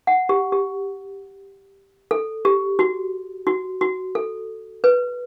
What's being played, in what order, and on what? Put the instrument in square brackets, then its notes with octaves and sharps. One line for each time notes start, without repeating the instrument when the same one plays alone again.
[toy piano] F#5
G4
G4
A4
G4
F#4
F#4
F#4
A4
B4